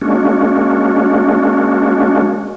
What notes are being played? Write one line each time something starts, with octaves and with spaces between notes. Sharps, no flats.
G#3 A#3 C#4 D4 F#4